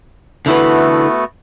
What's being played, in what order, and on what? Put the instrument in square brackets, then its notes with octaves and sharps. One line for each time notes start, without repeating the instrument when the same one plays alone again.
[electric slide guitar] D3 E4 B4 [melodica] A3 B3 F#4